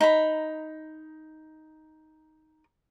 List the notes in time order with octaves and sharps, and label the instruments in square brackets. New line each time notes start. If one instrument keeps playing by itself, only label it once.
[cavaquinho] D#4 A#5 B5